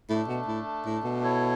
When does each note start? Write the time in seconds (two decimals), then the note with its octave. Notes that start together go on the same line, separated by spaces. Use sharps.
0.09 A2 A3 D4 A4
0.28 B2
0.47 A2
0.85 A2
1.04 B2
1.22 E4 A4 C#5